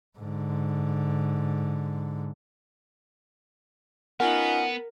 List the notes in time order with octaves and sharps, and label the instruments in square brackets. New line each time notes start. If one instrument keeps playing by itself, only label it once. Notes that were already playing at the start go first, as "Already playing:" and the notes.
[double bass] G#2 D3
[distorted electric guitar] B3 [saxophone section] C#4 D#4 F4 [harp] A#4 [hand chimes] F#5